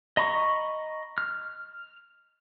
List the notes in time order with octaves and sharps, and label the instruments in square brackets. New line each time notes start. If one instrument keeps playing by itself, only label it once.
[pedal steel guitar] D#5 A#5 B5 C#6
F6